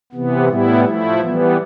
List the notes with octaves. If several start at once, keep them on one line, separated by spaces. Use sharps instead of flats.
C3 E3 B3
A2 G3 B3 E4
F3 A3 E4
E3 G3 B3